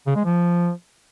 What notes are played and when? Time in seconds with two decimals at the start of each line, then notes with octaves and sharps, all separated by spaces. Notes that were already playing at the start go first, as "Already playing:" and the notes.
0.07 C#3
0.16 G#3
0.25 F3